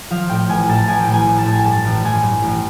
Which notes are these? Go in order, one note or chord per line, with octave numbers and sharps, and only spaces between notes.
F3 F5
A2 G5
A1 G#5
A2 A5
A1 G#5
G5
A1
G#5
A1
A5
A2
G#5
G2 A5
A1
A1 G#5
G2
A1